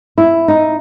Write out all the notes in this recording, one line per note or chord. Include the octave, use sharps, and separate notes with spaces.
E4
D#4